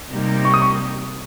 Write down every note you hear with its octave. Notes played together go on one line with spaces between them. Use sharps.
C3 G3 A#3 D#4 G4
C#6
D#6
C#6